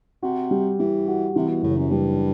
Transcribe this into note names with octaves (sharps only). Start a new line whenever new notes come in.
C3 F#4
G3
E3 G3
F#4
C3 E3
B2
F#1 A2
F#2
G2 G3